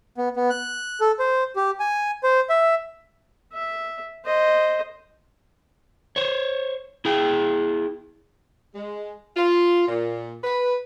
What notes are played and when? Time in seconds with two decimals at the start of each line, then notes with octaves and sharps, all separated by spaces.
0.18 B3
0.36 B3
0.50 F#6
1.01 A4
1.19 C5
1.56 G4
1.80 G#5
2.23 C5
2.50 E5
3.53 E5
4.25 C5 D#5
6.16 C5 C#5
7.05 E4 G#4 G5
8.75 G#3
9.36 F4
9.87 A#2
10.44 B4